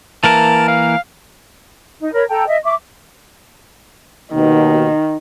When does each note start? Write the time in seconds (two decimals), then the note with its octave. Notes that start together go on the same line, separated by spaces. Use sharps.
0.24 E3 A#3 A#4 A5
0.68 F5
2.00 D#4
2.13 A#4 C#5 B5
2.29 A4 G5 A5 A#5
2.47 D#5 E5
2.63 E5 C#6 D6
4.34 D#2 B2 D#3